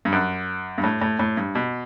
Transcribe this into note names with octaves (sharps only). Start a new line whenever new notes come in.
G2
F#2
G2
A2
A2
A2
G2
B2